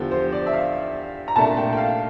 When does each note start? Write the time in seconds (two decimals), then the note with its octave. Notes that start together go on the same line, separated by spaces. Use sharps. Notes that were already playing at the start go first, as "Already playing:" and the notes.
Already playing: E2 D3 F3 G4
0.11 C5
0.32 D5
0.46 E5
0.53 F5
1.28 A#5
1.36 C2 A#2 A3 D4 A5
1.57 G5
1.73 G5
1.77 F5